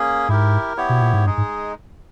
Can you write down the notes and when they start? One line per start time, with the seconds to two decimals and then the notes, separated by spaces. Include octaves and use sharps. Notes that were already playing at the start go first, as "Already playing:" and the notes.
Already playing: A#3 C#4 G#4
0.29 G#2 E4 G4 A#4
0.77 B3 E4 G4 C#5
0.89 B2
1.01 A#2
1.14 G#2
1.26 G2 G#3 D#4 G#4
1.38 G#2